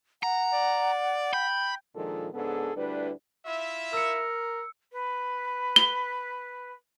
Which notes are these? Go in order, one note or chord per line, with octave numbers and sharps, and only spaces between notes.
F#5 A#5
D5
G5 B5
A#2 D#3 F3 G#3 D4 A4
G#2 C#3 B3 D4 G#4 A4
D2 G3 D4 E4 B4
E4 F4 E5
A#4 E6 C#7
B4
G7